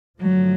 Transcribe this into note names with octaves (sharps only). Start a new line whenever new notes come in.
G2 D3 F3 F#3 A3